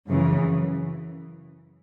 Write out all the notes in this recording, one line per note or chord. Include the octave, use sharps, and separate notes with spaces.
F#2 C#3 E3